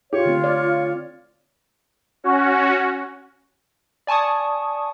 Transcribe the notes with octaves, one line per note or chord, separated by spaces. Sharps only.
F4 G4 C#5
D3 A3 C4
C#5 D5
C#4 F#4
D5 G#5 A5 C#6 D#6